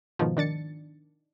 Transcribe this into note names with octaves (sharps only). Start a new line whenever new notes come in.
G#2 B2 D#3 F3
D#3 D4 A6 C#7